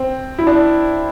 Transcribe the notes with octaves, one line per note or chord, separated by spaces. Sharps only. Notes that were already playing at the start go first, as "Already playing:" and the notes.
Already playing: C4
E4
D4